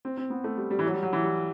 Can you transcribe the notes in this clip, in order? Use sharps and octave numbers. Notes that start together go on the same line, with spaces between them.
C4
C4
B3
A3
G3
G3
E3
F#3
G3
F#3
E3
G3